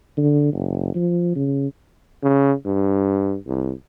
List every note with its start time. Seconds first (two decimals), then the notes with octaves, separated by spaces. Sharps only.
0.17 D3
0.53 F#1
0.95 F3
1.36 C#3
2.23 C#3
2.66 G2
3.47 C2